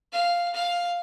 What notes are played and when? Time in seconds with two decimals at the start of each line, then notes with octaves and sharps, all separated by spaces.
0.12 F5
0.54 F5